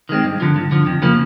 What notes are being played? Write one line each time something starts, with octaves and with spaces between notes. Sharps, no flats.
D#3 G#3 C4
G2
D3 F3
G2
D3 F3
F2
C#3 F3 A#3